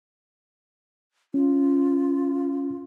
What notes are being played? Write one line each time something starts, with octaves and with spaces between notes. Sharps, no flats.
C#4 F4